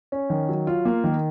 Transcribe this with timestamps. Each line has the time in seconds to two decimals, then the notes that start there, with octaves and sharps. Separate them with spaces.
0.12 C#4
0.30 D#3
0.49 F#3
0.67 F4
0.85 A#3
1.04 D#3